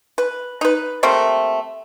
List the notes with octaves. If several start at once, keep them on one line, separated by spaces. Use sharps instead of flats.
B4
D#4 B4
G3 A3 A#3 C4